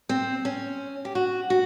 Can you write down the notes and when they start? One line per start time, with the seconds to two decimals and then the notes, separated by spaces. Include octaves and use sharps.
0.09 C4
0.45 C#4
1.05 G4
1.15 F#4
1.50 F#4